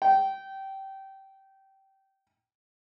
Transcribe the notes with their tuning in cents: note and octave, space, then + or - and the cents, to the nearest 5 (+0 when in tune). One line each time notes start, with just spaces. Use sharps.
G5 -20